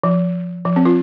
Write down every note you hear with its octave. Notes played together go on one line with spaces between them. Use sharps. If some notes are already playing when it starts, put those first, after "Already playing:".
F3
F3
C4
F4